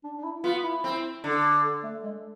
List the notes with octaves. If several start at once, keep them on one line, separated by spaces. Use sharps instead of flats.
D4
D4
E4
B3 F4
E4
C4
D3
A3
G#3